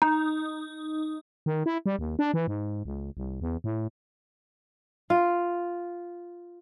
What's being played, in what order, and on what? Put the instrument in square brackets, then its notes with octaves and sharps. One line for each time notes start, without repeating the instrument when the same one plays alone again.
[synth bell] D#4 [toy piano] A#5
[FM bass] D#3
E4
G3
D#2
D4
E3
G#2
C#2
C2
E2
A2
[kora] F4